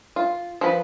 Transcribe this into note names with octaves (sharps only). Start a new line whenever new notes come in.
F4
F3 B4